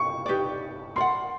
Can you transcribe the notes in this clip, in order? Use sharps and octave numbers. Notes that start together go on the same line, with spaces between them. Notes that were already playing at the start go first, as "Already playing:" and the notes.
Already playing: C#6
D#4 G4 B4 D5
A#4 D5 F#5 C6